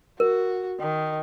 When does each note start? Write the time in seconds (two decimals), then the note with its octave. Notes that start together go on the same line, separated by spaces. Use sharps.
0.20 F#4 A#4
0.80 D#3